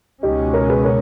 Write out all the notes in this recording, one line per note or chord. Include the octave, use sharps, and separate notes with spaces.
C#2 B2 G#3 C#4 D#4 G4
A#4 C#5
G#4 B4
A#4 C#5